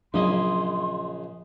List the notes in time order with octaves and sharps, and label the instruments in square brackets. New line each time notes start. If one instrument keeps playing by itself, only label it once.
[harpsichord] A#1 C#3 D#5 [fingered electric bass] F#3 D4 [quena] C6